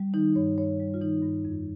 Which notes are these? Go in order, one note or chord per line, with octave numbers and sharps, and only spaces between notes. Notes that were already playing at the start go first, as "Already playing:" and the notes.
Already playing: G3
D#3 D#4
G2 C#5
G2 C#5
G3
F4
D#3 D#4
G2
F2